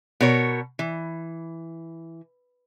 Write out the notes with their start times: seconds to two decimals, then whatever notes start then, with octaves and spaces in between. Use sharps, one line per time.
0.21 B2 A#4 C#5
0.79 E3